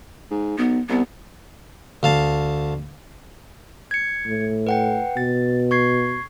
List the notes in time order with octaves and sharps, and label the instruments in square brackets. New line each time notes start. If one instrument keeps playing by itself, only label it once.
[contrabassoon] G#2
[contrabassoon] B1 [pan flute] B3
[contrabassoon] C2 [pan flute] B3
[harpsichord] D2 F5 A5
[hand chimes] G#6 C#7
[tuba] A2
[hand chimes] B4 F#5 G5
[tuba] B2 [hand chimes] A6
[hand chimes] C#6 G#6 C7